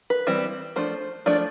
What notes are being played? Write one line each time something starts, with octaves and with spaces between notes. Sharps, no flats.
B4
E3 G3 C4
F3 A3 D4 C5
F3 A3 D4 D5